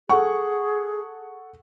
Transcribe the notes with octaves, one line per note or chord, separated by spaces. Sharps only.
G#4 A4 F#5 C#6